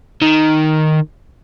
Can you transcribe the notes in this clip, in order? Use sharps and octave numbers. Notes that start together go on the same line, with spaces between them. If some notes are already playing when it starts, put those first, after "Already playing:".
D#3